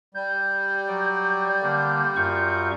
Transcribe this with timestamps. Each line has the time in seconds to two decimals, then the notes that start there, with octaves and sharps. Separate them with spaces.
0.15 G3 G6
0.88 F#3 D5
1.63 D3 A#3
2.16 F#2 F4 C#6